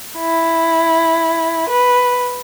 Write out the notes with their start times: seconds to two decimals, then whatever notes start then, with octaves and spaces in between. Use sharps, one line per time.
0.19 E4
1.70 B4